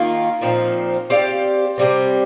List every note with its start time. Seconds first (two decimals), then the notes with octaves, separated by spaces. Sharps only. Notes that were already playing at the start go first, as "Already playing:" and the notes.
Already playing: D#3 A#3 F4
0.41 A#2 F3 C4 D#4
1.10 C4 G4 D5 F5
1.78 C3 G3 C4